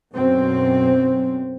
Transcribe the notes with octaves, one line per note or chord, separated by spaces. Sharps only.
B1 F#2 C4